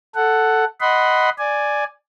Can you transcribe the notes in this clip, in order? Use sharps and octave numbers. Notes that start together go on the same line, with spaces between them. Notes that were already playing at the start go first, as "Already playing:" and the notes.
A4 F#5
D#5 F#5 B5 C6
D5 G#5